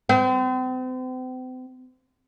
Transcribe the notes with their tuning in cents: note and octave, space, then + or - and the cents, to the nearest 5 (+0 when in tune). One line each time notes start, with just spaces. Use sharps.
C4 -40